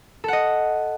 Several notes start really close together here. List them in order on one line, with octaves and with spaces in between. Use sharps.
A4 F#5 D#5